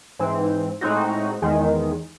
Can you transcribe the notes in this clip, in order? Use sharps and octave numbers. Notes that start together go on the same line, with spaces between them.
G#2 E3 C4
A2 G#3 C4 D#4 F#4
E2 D#3 G#3